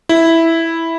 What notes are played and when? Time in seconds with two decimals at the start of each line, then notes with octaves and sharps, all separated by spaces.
0.09 E4